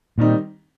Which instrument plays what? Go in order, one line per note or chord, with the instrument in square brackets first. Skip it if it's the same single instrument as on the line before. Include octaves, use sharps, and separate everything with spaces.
[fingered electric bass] A#2 [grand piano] D#3 G3 C4 D#4